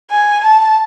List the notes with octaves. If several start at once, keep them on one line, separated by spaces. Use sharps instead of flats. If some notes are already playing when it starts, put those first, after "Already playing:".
G#5
A5